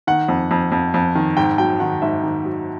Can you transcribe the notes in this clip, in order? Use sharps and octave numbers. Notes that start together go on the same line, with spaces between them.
D#3 F#5
F2
F2
F2
F2
D#3
G#2 G5
F#3 G5
D#3 F#5
G#2 E5
D#3
F#3